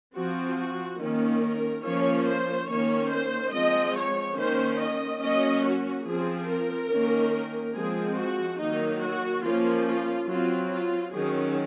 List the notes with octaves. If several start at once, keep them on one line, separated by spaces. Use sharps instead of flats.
F3 C4 F#4
F#4
D#3 A#3 C#4
A#4
F3 A#3 C#4 C#5
C5
D#3 A#3 C#4 C#5
C5
F3 G#3 C4 D#5
C#5
D#3 A#3 C#4 C5
D#5
F#3 A#3 C#4 D#5
F#4
F3 C4 G#4
A#4
D#3 A#3 C#4
F3 G#3 C4 G#4
F#4
D#3 F#3 A#3 D#4
F#4
F3 A#3 C#4 F4
F4
F#3 C4 F4
F4
D#3 F#3 C#4 G#4